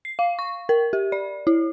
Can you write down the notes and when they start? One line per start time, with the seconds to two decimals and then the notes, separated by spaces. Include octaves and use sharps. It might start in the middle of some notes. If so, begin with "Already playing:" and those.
0.05 C7
0.19 F5
0.39 C#6
0.69 A#4
0.93 G4
1.12 D5
1.47 E4